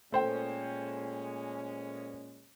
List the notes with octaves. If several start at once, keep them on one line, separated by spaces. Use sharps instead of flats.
A#2 G#3 A3 C#4 C5 G5